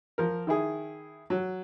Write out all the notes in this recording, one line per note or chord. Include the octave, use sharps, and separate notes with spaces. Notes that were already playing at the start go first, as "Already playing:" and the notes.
F3 A#4
D#3 E4 G#4
F#3